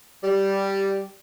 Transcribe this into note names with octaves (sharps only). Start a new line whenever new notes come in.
G3